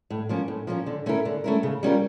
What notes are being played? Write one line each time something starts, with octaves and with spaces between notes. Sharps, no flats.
A2
F3 A#3 C#4
A2
F3 A#3 C#4
D3
A3 C#4 E4 A#4
D3
A3 C#4 E4 A#4
C#3
G3 C#4 F4 A#4